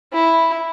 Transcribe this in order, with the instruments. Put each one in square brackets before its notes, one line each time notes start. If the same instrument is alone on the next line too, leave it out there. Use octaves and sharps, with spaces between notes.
[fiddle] E4